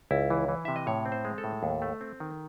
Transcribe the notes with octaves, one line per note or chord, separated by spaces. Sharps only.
C#2 E4
E3
E3
C3 E5
D#5
A2 C#5
C4
C5
G#3
A4
A2
D#2
A3
C4
D#3